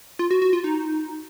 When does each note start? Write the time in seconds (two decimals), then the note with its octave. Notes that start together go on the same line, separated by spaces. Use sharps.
0.19 F4
0.31 F#4
0.42 F#4
0.53 F4
0.64 D#4